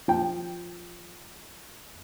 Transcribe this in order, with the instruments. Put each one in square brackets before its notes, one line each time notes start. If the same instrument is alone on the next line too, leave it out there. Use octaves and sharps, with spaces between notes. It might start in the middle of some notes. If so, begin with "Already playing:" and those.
[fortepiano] F3 G5